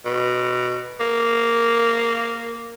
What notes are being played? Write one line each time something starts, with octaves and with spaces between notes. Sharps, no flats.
B2
A#3